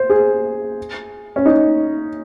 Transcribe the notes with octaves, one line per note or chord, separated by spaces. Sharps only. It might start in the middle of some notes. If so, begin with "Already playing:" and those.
Already playing: C5
G#4
C#4
D#4